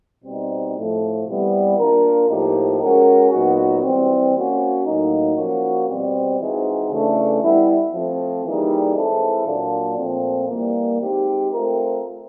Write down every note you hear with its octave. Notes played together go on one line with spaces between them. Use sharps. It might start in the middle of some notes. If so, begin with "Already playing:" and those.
B2 G3 C4 D#4
A2 F3 A3
C3 E3 G3 B3
A#3 D4 F4 A#4
A2 F3 A#3 D#4 G4
G#3 C#4 F#4 A#4
A#2 F#3 B3 D#4 F#4
E3 G3 C4
A#3 C#4 F#4
A2 F#3 A#3 D#4
F3 A#3 C#4 F#4
B2 G3 C4
E3 G#3 C4 D#4 F#4
C#3 E3 A3 D4
G3 B3 E4
F3 A3 C4
E3 G3 A#3 D#4 G#4
E3 G#3 C4 E4 A4
A#2 F#3 A#3 D4 F4
A#2 F3 A3 C4
E3 G3 A#3
G#3 C4 D#4 G4
A3 C4 F4 A#4